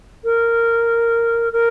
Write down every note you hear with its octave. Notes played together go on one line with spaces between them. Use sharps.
A#4
A#4